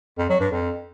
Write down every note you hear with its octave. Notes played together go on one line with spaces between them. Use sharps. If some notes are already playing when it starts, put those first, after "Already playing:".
F2
F#3
G2
F2